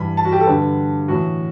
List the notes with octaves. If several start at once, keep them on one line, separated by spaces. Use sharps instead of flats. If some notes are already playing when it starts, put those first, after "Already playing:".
Already playing: G2 E3 B5
A5
F#4
G4
A4
G2 D3 B4
A2 E3 F#4